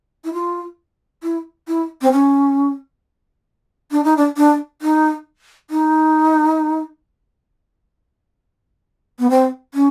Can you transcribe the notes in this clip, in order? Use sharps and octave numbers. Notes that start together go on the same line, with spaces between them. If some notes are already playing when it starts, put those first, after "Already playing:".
E4
F4
E4
E4
C4
C#4
D4
D#4
D4
D4
D#4
D#4
B3
C4
C#4